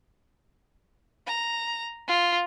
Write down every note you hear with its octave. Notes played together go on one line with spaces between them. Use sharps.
A#5
F4